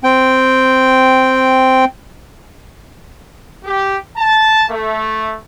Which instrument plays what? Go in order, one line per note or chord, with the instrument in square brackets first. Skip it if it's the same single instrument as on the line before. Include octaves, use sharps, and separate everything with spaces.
[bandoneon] C4 G5
[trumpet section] G4
A5
A3